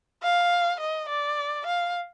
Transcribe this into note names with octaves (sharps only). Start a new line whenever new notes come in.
F5
D#5
D5
F5